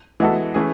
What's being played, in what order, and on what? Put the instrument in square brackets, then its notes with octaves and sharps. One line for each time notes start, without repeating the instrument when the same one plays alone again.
[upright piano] E3 G#3 B3 F#4 A4
E3 A3 C#4 G#4